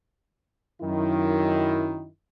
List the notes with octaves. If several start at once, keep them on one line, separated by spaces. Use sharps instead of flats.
F#2 D#3 E4